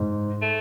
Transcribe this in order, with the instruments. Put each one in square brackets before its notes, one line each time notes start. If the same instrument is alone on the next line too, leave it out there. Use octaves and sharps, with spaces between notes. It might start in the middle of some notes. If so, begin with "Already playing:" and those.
Already playing: [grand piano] G#2
[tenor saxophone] A3